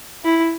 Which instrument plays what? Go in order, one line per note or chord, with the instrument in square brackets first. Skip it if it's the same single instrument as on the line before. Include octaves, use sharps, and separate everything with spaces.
[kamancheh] E4